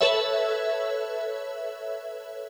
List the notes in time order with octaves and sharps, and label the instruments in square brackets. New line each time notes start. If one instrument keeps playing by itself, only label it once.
[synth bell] A4 B4 C#5 E5